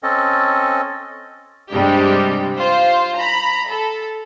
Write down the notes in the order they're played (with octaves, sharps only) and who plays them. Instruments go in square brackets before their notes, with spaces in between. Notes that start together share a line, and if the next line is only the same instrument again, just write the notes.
[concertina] C4 C#4 A4 D#5
[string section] G2 C3 G3 G#3 D4 G4
F4 C5
A#5 B5
A4